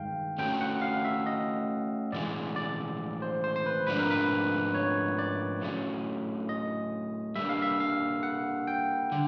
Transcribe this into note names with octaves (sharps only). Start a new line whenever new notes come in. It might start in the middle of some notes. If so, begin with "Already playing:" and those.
Already playing: G2 D#3 G#3 F5 G5
A3 C#4 F#4 A4 G5
F#5
F5
E5
D#5
A2 E3 G#3 D5
D5
C5
C5
C5
B4
G#2 F3 A3 D4 B4
A#4
B4
C#5
D5
A2 F#3 A3 C#4
D#5
G3 A#3 D4 E5
F5
E5
F5
F#5
G5
D3